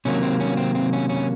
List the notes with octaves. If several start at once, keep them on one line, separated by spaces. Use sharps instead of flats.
C3 D#3 F#3 A#3 C#4
C4
C#4
C4
C4
C#4
C#4